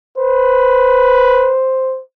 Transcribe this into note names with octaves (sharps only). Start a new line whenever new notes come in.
B4 C5